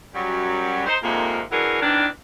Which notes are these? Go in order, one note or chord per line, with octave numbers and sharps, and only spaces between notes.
F#2 F#3 G3
D#4 C5
F2 G#2 C3 D#3 A#3
E3 F#3 C#4 D4 G#4 A#4
D#3 E3 B3 C4 D4